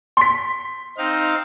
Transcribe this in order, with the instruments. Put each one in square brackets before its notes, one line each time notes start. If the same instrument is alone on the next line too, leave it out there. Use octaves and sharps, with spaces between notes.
[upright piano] C6 B6
[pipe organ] C4 D#4 F5